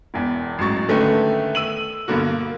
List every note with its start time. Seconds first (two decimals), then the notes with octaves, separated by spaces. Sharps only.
0.14 E1 E2
0.58 A1 G#2 F#3 C#6 A6
0.88 D3 D#3 A3 C#4 B4
1.55 E6 D#7 F#7
2.08 G2 B2 D3 A#3 F#4
2.24 A#3